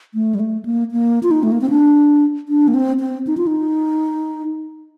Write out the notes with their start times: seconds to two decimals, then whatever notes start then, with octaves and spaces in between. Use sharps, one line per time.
0.14 A3
0.35 G3
0.40 A3
0.65 A#3
0.92 A#3
1.23 F4
1.31 D#4
1.43 A3
1.52 A#3
1.61 C4
1.70 D4
2.49 D4
2.68 A#3
2.74 C4
3.00 C4
3.27 D#4
3.37 F4
3.47 D#4